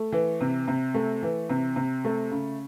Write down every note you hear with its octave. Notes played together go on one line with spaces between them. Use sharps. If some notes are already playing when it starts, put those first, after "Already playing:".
Already playing: A3
E3
C3
C3
A3
E3
C3
C3
A3
C#3